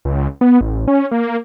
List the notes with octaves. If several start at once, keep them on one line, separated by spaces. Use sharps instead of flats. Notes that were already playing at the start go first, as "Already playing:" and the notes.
C#2
B3
A1
C#4
A#3